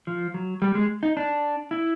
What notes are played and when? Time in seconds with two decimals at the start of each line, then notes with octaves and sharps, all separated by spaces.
0.07 F3
0.34 F#3
0.62 G3
0.75 G#3
1.03 D#4
1.17 D4
1.71 E4